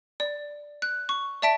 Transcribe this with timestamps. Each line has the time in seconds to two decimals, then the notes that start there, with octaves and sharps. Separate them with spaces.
0.20 D5
0.82 F#6
1.09 C#6
1.42 D5 E5 A5 B6 D7